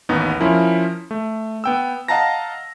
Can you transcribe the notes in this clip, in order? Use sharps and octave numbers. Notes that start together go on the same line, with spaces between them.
A1 D#2 B3 D#4
F3 C#4 E4 A#4
A3
B3 G5 E6
D#5 F5 F#5 A5 A#5 A#6